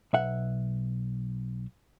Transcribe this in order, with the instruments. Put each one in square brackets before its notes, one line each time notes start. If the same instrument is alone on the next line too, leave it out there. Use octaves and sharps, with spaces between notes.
[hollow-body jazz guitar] B1 E5 F#5